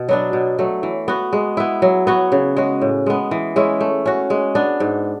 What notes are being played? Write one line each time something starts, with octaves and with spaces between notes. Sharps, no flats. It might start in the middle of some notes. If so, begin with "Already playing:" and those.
Already playing: B2
F#3 B3 D4
B2
F#3 A3
E3
B3 F#4
G#3
B3 E4
F#3
B3 F#4 C#5
C#3
G#3 C#4 F#4
A2
G#3 B3
E3
G#3 C#4 E4
A3
C#4 F#4
G#3
B3 D4
G#2